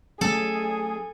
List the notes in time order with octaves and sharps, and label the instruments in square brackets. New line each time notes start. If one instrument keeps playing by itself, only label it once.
[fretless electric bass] F#3 A3 C#4 [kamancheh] G#4 [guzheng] A4